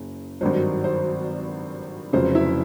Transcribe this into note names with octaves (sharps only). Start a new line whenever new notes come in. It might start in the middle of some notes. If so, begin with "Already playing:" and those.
Already playing: F#1 C#3
G#1 G2 D#3 F#3 C5
C5
F1 F2 C#3 F#3 C5
E4 E5